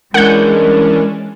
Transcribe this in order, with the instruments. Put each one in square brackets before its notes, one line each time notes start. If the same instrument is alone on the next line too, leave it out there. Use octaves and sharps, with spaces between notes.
[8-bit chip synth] E3 C#4 D4 [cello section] G#3 [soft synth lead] A#4 [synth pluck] F#5 G6